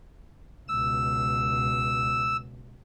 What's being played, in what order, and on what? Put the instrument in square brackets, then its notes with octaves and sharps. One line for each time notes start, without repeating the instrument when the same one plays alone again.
[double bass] C#2 B2 [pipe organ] E6